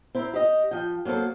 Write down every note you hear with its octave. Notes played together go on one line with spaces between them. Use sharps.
C4 E4 A#4
G4 D#5
F3 G5
F#3 A#3 C4 A4